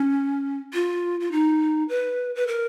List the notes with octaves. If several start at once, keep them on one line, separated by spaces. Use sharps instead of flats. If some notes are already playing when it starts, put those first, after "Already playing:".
Already playing: C#4
F4
F4
D#4
B4
B4
A#4